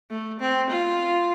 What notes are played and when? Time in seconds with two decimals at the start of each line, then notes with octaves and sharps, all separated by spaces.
0.11 A3
0.40 C4
0.70 F4